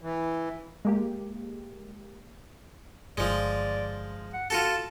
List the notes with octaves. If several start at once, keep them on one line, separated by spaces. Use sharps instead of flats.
E3
G#3 A#3 G4
G1 F3 G#3 D5
F#5
F4 F#4 A4 A5